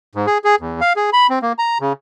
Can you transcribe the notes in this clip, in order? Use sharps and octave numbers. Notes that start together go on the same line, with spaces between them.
G#2
G#4
G#4
E2
F5
G#4
B5
C4
A#3
A#5
C#3